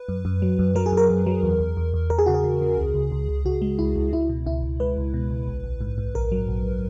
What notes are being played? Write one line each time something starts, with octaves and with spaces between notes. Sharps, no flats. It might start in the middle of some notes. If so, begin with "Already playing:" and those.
Already playing: B4
F#2
F#2
F#3
F#2
F#3 A#4
G#4
F#2 A#4
F#2
F#3
E2
E2
E2
E2
E2 A#4
G#4
C#3 F#4
G#4
C#3
C#3
C#2
C#2
C#2
C#2
C#2 F#4
G#3
C#2 E4
C#2
C#2 E4
B2
C#2 E4
C#2
G#3 B4
C#2
B2
C#2
A#1
A#1
G#2
G#2
A#1 A#4
F#3
A#1